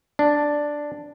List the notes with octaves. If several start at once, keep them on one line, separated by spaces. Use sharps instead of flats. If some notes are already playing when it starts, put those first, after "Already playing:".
D4